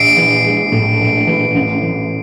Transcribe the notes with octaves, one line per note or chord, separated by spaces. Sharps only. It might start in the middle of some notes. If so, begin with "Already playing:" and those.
Already playing: A#1 C7 D7
E3
G#3
A2
A#1
E3
A1
E3